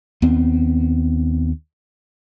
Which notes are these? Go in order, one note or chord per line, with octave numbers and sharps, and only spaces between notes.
D#2 B3 C4